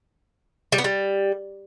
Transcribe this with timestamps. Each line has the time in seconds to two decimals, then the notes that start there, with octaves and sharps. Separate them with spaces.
0.72 G3
0.78 B3
0.84 G3